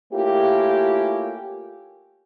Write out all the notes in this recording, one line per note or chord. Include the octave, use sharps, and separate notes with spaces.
A3 A#3 C#4 E4 F4 G4